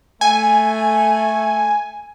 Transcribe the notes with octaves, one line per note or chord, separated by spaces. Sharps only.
A3 G#5